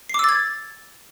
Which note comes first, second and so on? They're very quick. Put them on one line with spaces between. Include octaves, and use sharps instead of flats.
C7 D6 E6 A6 G#6